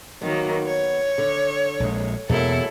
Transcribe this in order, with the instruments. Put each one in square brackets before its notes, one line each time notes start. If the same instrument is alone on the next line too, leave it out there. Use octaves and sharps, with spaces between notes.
[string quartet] D#3 F#3 A#3 [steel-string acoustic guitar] B3
[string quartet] C#5
[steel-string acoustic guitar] D3
[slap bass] A#1 G#3
[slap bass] E2 B2 [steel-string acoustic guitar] F#3 G#3 A#3 [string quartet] E4 A4